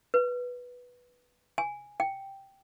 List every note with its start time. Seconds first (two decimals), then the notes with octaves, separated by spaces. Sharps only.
0.14 B4
1.58 G#5
2.00 G5